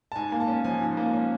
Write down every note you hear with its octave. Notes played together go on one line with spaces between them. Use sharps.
A5
G#2 G#5
A#3
A5
C#4
F3 G#5
G#2
A#3
C#4